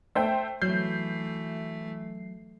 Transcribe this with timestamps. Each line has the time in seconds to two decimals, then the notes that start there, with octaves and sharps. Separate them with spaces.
0.15 A3 C5 E5 G5
0.62 E3 F#3 A3 G6 C7